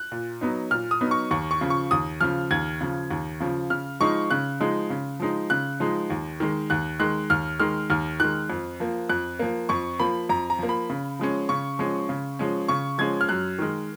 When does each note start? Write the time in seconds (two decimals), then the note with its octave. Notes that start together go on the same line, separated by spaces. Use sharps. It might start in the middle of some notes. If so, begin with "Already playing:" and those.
Already playing: F#6
0.12 A#2
0.41 F#3 B3 D#4
0.71 A#2 F6
0.91 D#6
1.01 F#3 B3 D#4
1.11 C#6
1.31 D#2 C#6
1.51 C#6
1.61 C#3 F3
1.70 C#6
1.91 D#2 D#6
2.21 C#3 F3 F6
2.51 D#2 G#6
2.81 C#3 F3
3.11 D#2
3.40 C#3 F3
3.70 C#3 F6
4.00 F3 G#3 D#4 C#6
4.30 C#3 F#6
4.60 F3 G#3 D#4
4.90 C#3
5.20 F3 G#3 D#4
5.50 C#3 F#6
5.80 F3 G#3 D#4
6.10 D#2
6.40 D#3 G#3
6.70 D#2 F#6
6.99 D#3 G#3 F#6
7.30 D#2 F6
7.60 D#3 G#3 F6
7.90 D#2 F6
8.20 D#3 G#3 F#6
8.50 F2
8.80 F3 A#3
9.09 F2 F#6
9.39 F3 A#3
9.69 F2 C#6
9.99 F3 A#3 B5
10.29 F2 A#5
10.50 A#5
10.59 F3 A#3
10.69 B5
10.90 C#3
11.19 F3 G#3 C#4
11.49 C#3 C#6
11.79 F3 G#3 C#4
12.09 C#3
12.39 F3 G#3 C#4
12.68 C#3 C#6
12.98 F3 G#3 C#4 G#6
13.21 F6
13.29 F#2 F#6
13.59 D#3 G#3